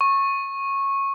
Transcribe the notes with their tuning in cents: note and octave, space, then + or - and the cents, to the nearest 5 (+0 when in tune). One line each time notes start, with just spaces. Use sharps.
C#6 -15